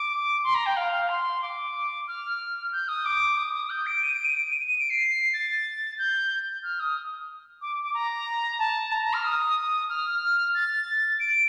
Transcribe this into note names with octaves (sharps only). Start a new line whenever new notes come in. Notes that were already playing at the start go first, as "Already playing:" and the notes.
Already playing: D6
C6
A#5
G5
F5
F5
C6
D6
F6
G6
D#6
D6
D#6
D#6
G6
D7
D#7
D7
D#7
D7
D#7
D#7
D7
C7
A6
G6
F6
D#6
D6
D6
A#5
A5
A#5
A#5
F6
D#6
F6
A6
D7